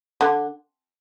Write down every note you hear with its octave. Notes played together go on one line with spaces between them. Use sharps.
D3